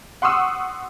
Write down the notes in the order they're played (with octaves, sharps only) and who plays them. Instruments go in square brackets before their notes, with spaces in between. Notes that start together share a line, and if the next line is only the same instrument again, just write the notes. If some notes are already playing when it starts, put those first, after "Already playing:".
[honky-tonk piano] F#5 C6 C#6 D#6 E6